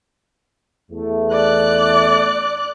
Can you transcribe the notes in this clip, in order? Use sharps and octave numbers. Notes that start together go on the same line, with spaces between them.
E2 A3
D5 F#6